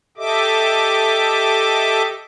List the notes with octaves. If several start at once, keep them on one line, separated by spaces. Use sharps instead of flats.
G4 A4 D#5 E5 D6